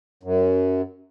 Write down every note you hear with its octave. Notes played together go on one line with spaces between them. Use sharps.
F#2